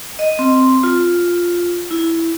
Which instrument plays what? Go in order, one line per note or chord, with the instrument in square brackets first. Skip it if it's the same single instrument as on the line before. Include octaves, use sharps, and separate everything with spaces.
[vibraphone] D#5
C4
F4
E4